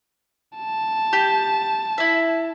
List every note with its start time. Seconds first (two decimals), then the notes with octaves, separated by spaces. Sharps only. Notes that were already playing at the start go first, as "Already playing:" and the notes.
0.58 A5
1.13 G4
1.98 E4 E5